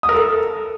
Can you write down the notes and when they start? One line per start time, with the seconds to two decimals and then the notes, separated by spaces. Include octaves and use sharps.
0.03 D#6
0.09 A#4
0.14 A4